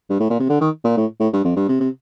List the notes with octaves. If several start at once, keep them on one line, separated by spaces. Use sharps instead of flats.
G2
A2
A#2
C3
D3
D#3
A#2
A2
A2
G2
F2
G2
C3
C3